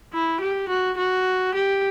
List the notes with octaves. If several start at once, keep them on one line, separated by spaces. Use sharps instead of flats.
E4
G4
F#4
F#4
G4